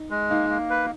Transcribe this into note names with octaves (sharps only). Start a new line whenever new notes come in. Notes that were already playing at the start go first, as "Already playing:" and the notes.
Already playing: D#4
G#3
A#3 D#4
A#3
B4